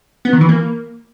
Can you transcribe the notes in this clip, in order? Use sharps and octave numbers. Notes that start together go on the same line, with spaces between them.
B3
D#3
E3
A#3